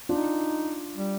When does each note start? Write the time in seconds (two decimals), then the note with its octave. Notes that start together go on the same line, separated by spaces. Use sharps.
0.09 D4 D#4 F4
0.94 G3